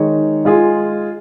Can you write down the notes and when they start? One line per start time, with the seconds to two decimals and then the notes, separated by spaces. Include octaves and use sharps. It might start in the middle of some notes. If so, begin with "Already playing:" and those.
Already playing: D#3 G#3 D#4 C#5
0.45 G#3 F4 G#4